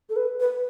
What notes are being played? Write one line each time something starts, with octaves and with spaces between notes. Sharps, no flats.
A4
B4
B4